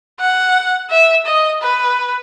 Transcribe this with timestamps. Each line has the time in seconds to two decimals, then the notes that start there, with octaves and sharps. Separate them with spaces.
0.20 F#5
0.90 E5
1.26 D#5
1.62 B4